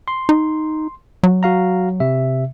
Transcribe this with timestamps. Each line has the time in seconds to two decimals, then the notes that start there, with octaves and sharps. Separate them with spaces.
0.08 C6
0.29 D#4
1.23 F#3
1.43 F#4 F5 A#5
2.00 C3 E5